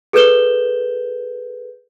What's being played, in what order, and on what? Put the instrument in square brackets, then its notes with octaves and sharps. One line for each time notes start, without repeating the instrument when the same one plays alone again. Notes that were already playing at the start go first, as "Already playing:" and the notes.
[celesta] G#4 A4 B4 G6 E7 G7